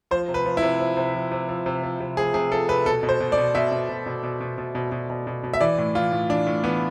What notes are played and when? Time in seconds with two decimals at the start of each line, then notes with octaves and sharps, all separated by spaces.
0.11 F3 C5
0.28 C3
0.34 B4
0.46 F3
0.57 E4
0.63 C3
0.80 F3
0.97 C3
1.14 F3
1.32 C3
1.49 F3
1.66 C3
1.83 F3
2.00 C3
2.17 F3 G#4
2.34 C3 G#4
2.51 F3 A4
2.69 C3 B4
2.86 B2 A4
3.03 B2
3.09 C5
3.20 B2
3.32 D5
3.37 B2
3.55 B2 E5
3.72 B2
3.89 B2
4.06 B2
4.23 B2
4.41 B2
4.58 B2
4.75 B2
4.92 B2
5.10 B2
5.27 B2
5.44 B2
5.53 E5
5.61 E3 D5
5.78 A2
5.95 E3 F4
6.12 A2
6.29 E3 D4
6.47 A2
6.64 E3 B3